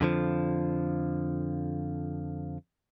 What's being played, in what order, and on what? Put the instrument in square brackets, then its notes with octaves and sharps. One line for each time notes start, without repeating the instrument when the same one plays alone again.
[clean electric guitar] F2 D3 F3